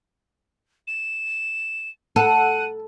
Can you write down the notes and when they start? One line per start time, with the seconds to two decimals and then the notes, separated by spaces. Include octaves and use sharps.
0.87 E7
2.16 A4 F#5 D#7